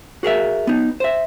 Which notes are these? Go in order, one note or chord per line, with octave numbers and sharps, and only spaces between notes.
F#4 G#4 A#4 E5
B3 D#4
C5 E5